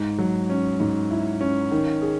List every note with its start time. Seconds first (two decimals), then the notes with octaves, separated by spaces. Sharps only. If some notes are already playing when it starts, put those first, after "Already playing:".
Already playing: G#2
0.19 F#3
0.50 C#4
0.80 G#2
1.11 E4
1.41 C#4
1.71 D#3
2.02 G#4